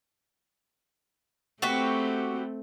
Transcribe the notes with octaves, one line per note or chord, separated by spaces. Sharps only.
A3 C4 F#4 G4 B4